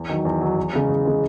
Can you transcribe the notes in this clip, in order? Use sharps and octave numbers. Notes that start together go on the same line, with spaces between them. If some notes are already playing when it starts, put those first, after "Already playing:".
Already playing: E2
D#3 F#3
E2
D#3 F#3
E2
C#3 G#3
E2
C#3 G#3